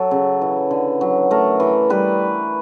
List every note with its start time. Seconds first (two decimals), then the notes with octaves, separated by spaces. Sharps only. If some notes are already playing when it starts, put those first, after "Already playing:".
Already playing: F#3 A4
0.11 C#3
0.42 E3
0.71 D3
1.01 F#3
1.31 A3 A#4
1.60 E3
1.90 G3 B4